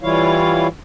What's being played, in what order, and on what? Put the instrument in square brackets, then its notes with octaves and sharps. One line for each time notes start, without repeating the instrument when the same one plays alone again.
[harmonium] E3 G3 E4 F4 C#5 F5